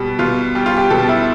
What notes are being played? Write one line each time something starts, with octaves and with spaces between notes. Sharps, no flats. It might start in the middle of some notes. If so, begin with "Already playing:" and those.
Already playing: B2 G3
B2 F4
G3 G4
F4
G4
B2 A4
E4